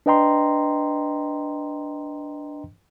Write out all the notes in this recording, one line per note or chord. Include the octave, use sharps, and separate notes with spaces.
D4 B4 D#5 G5 A#5 C6